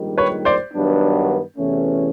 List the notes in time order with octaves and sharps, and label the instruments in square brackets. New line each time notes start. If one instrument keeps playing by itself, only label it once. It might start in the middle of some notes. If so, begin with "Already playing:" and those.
Already playing: [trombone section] A#1 G#2 D#3 G3
[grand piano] B4 C#5
C5 D5
[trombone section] G2 D#3 F#3 B3 D4
E2 C3 E3 A3 C#4